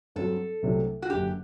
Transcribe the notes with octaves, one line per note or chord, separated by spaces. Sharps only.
G2 F#3 C4 F#4 A4
C2 C3 F#3 A3 D4
F#4
F#1 F#2 D3 G4